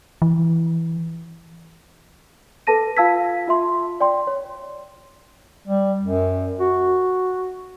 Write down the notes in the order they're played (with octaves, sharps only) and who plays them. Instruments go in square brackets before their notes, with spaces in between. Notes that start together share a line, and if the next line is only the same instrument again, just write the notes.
[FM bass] E3
[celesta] A4 B4 A5 A#6 D#7
F4 F5 A5 E6 G#6 B6
F4 E5 C6
D5 G5 C6
C#5
[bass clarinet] G3
F#2
F#4